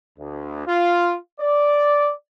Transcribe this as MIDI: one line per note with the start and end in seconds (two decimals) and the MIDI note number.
0.19 0.65 38
0.67 1.17 65
1.40 2.12 74